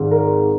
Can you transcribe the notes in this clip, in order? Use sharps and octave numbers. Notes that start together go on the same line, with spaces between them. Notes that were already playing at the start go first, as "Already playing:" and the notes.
Already playing: G#1 G#2 D#3
A#4